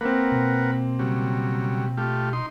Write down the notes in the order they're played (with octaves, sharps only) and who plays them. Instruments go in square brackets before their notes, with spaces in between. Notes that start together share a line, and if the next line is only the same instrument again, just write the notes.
[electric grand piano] A#3 C4 [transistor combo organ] A#4 B4 F#5
[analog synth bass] B2
[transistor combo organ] C#3 F#3 G3
A3 F4 G4
D#4 C6